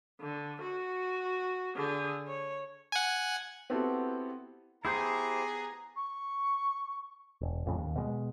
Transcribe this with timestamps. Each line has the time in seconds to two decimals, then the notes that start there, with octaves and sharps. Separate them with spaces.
0.20 D3
0.62 F#4
1.76 D3 G#4
2.27 C#5
2.92 F#5 G#5
3.70 B3 C4 E4 F#4 G4 A4
4.85 B3 E4 G4 G#4 C5 A#5
5.96 C#6
7.41 E1
7.66 A1 F2 A2 C#3
7.78 D#2
7.96 B2 G3 G#3